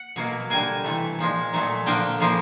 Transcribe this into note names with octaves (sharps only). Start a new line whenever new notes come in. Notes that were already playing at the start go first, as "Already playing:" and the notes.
Already playing: F#5
B2 F#3 A#3
D3 G3 A#3 G#5
C3 E3 A3
A#2 F3 G#3
A#2 F#3 A3
D3 F3 A#3 G5
C#3 F3 A#3